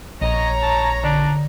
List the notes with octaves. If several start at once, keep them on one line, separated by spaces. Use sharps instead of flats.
A#1 C#5 D#5 A#5
A5
D3 D4